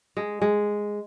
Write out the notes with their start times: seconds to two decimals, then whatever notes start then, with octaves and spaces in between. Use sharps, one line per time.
0.17 G#3
0.42 G#3